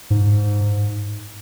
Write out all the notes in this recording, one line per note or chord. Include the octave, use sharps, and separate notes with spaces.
G#2